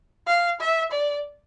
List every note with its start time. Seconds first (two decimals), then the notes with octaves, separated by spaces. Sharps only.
0.27 F5
0.60 E5
0.91 D5